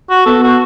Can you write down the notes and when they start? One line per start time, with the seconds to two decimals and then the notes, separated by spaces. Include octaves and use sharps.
0.10 F#4
0.26 B3 A4
0.43 F#4